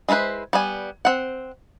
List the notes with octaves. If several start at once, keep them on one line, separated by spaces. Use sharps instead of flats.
G#3 E4 A4 B4 C5
G3 B3 G#5
C4 F#5